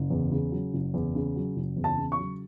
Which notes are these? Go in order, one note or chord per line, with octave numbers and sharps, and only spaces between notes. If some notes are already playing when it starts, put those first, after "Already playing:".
Already playing: F#1
E2
C#3
F#3
F#1
E2
C#3
F#3
F#1
E2
A5
C#3
C#6
F#3